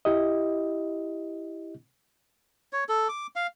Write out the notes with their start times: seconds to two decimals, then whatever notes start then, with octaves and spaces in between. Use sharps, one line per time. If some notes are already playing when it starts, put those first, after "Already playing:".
0.05 E4 G4 D#5
2.73 C#5
2.89 A4
3.09 D6
3.36 F5